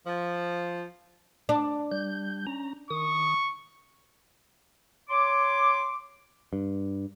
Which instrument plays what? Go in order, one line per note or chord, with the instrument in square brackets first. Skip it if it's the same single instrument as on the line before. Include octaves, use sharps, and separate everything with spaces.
[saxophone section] F3
[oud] D4
[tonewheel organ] G3 G6
C#4 A#5
[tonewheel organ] D#3 D#6 [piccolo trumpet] C#6
[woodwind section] C#5 C6 D6
[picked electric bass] G2